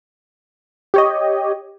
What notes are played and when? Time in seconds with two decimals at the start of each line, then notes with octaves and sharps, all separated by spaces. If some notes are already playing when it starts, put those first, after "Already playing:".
0.94 G4 C#5 D#5